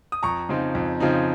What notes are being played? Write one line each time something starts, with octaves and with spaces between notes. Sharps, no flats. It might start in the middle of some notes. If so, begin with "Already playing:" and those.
D#6
F2 A#5 C#6
C#3 F3 C4 D#4
F2
C#3 F3 C4 D#4